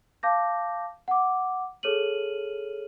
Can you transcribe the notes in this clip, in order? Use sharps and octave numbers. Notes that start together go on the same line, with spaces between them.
F5 A5 D6 G6 A#6
F#5 D6
G#4 A4 C#5 F6 D#7 F#7